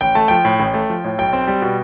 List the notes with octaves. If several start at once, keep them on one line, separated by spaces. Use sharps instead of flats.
A1 G5
A3 A5
F3 G5
A2
A1
A3
F3
A2
B1 G5
C4
G3
B2